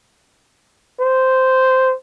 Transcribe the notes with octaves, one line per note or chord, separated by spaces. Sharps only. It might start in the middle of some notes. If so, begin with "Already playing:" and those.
C5